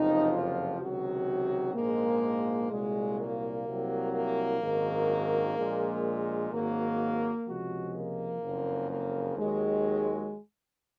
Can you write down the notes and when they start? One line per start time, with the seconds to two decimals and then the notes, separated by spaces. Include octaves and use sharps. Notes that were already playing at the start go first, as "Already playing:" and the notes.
Already playing: F#1 F2 C3 F3 D#4
0.32 F4
0.79 C#2 C3 D#3 F#3 F#4
1.75 A#1 G#2 F3 G#3 A#3
2.70 C2 A#2 F#3 G#3
3.18 A#3
3.66 C2 C3 F#3
4.13 A#3
4.61 G#1 F#2 D#3
5.56 A#1 A#2 G#3
6.52 G#1 G#2 F#3 A#3
7.47 C#2 C3 F3 G#3 F#4
7.94 A#3
8.42 F#1 F2 C#3
8.90 A#3
9.37 D#2 D#3 F#3 G#3